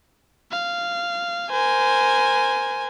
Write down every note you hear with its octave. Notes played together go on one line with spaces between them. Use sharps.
F5
A#4 C5 G#5